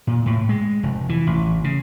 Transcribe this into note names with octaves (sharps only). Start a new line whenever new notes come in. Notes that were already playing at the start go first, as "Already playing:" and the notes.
A#2
A2
G#3
F1
E3
A1
C#3